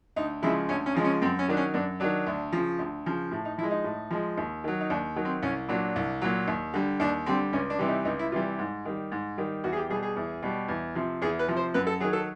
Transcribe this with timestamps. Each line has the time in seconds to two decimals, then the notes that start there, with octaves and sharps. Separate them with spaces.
0.16 D2 D#4
0.42 C#3 F3 G#3 E4
0.69 D2 C#4
0.86 C#4
0.95 C#3 F3 G#3
1.05 C#4
1.21 F#2 C4
1.39 C#4
1.48 D#3 F#3 D4
1.57 C#4
1.74 F#2 D4
2.00 D#3 F#3 D4
2.27 D2
2.53 C#3 F3
2.79 D2
3.06 C#3 F3
3.31 A2
3.45 D#4
3.58 F3 E4
3.63 G#3
3.71 D#4
3.84 A2
4.11 F3 G#3
4.38 D#2
4.64 D#3 F#3
4.81 D#4
4.90 D#2 D4
5.16 D#3 F#3
5.25 C4
5.42 C2 C#4
5.69 A#2 F#3 D4
5.96 C2
6.21 A#2 F#3
6.48 D#2
6.74 D3 G3
7.00 D#2 D4
7.26 D3 G3 C4
7.53 C#2 C#4
7.70 D4
7.79 C3 E3 G3
7.88 D#4
8.05 C#2 D#4
8.19 E4
8.32 C3 E3 G3 F4
8.59 G#2
8.85 D#3 G3
9.12 G#2
9.38 D#3 G3
9.64 E2 F#4
9.73 G#4
9.77 G4
9.89 B2 G3 G#4
10.03 G#4
10.16 E2
10.43 B2 G3
10.68 E2
10.95 C3 F3
11.22 E2 G#4
11.39 B4
11.48 C3 F3
11.56 C5
11.74 F#2 B4
11.87 A4
12.00 D#3 F#3 G#4
12.13 A4